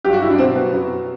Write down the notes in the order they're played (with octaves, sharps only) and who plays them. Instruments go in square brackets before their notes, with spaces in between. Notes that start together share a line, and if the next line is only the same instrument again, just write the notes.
[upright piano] G2 F#3 G4
F#4
E4
D4
B2 F#3 C4
B3
F#2 F#3